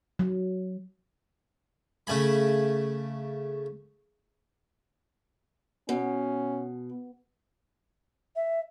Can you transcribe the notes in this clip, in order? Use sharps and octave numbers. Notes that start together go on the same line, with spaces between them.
F#3
C#3 A3 G#5 B5
B2 C#4
E5